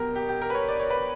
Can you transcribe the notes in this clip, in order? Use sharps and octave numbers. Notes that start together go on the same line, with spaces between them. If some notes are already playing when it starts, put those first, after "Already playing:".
Already playing: B2 F#3 B3 G4 A#4
G4
G4
A#4
B4
C#5
D5
C#5
B4